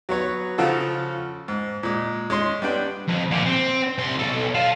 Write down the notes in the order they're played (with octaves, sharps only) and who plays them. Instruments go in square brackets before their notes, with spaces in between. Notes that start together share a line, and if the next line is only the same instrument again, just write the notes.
[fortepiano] F#3 B3 C#5
C#3 F3 F4 F#4 A4
G#2
A#2 G#3
G#3 C#4 C6
G3 B3 D4 G5
[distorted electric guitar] F2
A#2 G4
C4
C2 C6
B1 A4
F5 A5